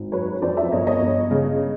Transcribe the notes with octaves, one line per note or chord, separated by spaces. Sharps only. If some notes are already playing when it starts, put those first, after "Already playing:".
Already playing: G#1
F#2 B4 C#5
F2 C5 D5
D5 E5
G1 C#5 D#5
C#5 D#5
G1
C#3